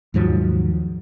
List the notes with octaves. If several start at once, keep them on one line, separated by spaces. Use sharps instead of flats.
D#2 G#2 F3 F#3